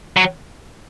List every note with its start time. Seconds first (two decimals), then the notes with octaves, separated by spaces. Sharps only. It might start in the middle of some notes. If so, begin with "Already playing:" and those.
0.17 F#3